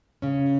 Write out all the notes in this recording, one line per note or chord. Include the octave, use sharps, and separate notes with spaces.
C#3 C#4